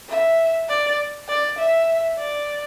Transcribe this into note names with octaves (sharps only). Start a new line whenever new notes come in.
E5
D5
D5
E5
D5